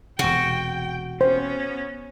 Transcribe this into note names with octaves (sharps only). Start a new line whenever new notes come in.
E1 C3 F#4 G5
B3 C#4 C5